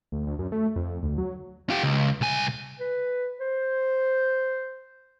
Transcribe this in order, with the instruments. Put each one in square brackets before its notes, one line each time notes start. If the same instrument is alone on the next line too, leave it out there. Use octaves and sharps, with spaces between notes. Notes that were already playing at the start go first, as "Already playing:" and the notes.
[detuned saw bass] D2
D2
F#2
A3
F2
D2
F#3
[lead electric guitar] F4 G4
C#2
C2 G#5
[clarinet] B4
C5